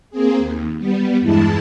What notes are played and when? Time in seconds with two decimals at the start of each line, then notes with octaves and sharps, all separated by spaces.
0.11 A#3 C4 G#4
0.39 D#2
0.78 G3 B3
1.21 E2 G2 G#3 E4 A5